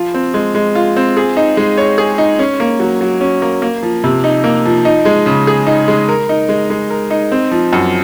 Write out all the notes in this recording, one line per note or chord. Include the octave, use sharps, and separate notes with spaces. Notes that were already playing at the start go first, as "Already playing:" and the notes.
Already playing: F3 F4
C4
G#3
G#3
F4
C4
G#4
D#4
G#3
C#5
G#4
D#4
C#4
A#3
F#3
F#3
C#4
A#3
A#3
F3
C3
D#4
A#3
F3
D#4
G#3
C#3
G#4
D#4
G#3
A#4
D#4
G#3
G#3
A#4
D#4
C4
F3
F#2